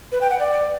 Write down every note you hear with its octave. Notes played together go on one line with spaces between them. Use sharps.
B4
G5
F#5
D5